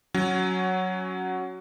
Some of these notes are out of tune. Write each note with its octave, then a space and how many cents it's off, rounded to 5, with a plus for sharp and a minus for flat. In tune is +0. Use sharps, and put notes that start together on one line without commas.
F#3 +0 C#4 +0